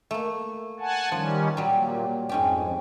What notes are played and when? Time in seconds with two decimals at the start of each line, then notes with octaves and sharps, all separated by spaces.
0.11 A3 A#3
0.80 F#5 G#5 A5
1.12 D#3 F3 G3 C#4
1.57 A#2 F#3 G3
2.29 F2 G#2 C#4 G4